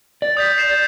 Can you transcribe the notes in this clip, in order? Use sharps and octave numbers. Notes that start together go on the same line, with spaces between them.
D5 A6
D#6 G6 B6
C7 E7